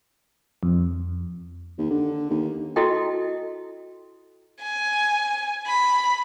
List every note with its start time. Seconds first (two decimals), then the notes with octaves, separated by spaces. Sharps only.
0.63 F2
1.78 D#2
1.90 D3
2.30 D#2
2.76 E4 F#4 A4 D#5 G5
4.62 G#5
5.67 B5